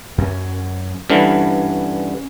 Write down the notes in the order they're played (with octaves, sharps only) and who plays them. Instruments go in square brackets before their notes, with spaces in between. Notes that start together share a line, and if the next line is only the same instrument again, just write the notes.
[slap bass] F#2 C#4
[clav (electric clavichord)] G2 D3 E3 [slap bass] C#4